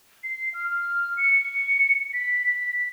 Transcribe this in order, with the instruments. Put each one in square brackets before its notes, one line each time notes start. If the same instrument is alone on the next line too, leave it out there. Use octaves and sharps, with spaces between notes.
[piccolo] C7
F6
C#7
C#7
B6
B6